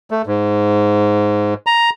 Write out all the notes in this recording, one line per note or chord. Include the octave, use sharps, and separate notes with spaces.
A3
G#2
A#5